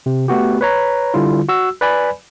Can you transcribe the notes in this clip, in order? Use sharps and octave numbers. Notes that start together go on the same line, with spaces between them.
C3
A3 B3 F#4 G4
B4 C#5 A#5
D3 G3 E4 F4
F#4 E6
B4 D5 G#5 B5